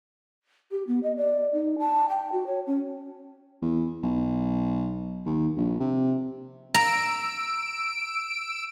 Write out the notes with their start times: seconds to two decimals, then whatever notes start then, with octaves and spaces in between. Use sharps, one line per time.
0.71 G4
0.87 B3
1.03 D#5
1.17 D5
1.53 D#4
1.79 A5
2.09 G5
2.32 F#4
2.47 C#5
2.67 C#4
3.62 E2
4.03 B1
5.26 D#2
5.57 A#1
5.80 C3
6.74 A#5 E6 D7